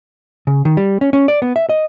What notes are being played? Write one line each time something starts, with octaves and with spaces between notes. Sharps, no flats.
C#3
D#3
G3
C#4
C#4
D5
B3
E5
D#5